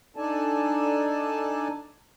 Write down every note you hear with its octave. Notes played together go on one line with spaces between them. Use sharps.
D4 D#4 A4 D5 G#5 A5